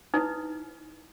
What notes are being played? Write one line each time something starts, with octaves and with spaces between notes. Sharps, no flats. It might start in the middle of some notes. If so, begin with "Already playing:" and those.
D#4 E4 B4 D#6